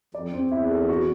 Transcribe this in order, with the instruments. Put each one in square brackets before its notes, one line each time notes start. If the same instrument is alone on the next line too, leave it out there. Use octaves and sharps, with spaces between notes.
[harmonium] F2 [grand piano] D5
[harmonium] E2 [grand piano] C4
[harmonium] E2 [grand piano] E4
[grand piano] A4
F#4